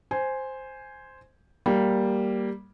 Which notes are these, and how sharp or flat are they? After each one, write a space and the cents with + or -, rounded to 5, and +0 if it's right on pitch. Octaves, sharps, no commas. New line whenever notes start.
C5 +0 G#5 +0
G3 -5 A#3 +0